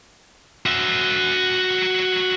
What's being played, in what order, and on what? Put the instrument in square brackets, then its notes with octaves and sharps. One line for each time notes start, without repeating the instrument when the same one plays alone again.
[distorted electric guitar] F#4 E5